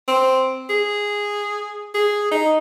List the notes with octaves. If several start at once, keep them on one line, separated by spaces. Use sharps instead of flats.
C4
G#4
G#4
D#4